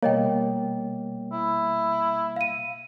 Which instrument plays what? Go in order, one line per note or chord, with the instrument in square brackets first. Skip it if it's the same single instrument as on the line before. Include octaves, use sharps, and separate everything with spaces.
[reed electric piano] B2 G3 A#3 [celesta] C#5 D#5 G5
[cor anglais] E4
[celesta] F5 D#7